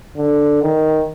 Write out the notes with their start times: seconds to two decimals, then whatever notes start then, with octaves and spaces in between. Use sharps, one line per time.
0.17 D3
0.62 D#3